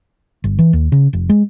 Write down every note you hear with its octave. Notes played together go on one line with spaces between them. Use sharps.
G1
E3
D#2
C#3
F1
G#3